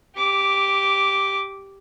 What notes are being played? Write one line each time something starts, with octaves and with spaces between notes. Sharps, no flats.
G4 D6